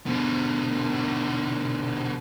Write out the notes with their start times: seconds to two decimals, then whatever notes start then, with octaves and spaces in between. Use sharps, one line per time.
0.06 B2 D3